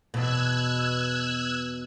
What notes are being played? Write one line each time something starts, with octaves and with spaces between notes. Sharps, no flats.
E2 B2 E6 F#6 G#6